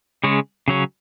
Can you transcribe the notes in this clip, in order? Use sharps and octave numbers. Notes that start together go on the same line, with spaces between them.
C#3 G#3 C#4
C#3 F#3 C#4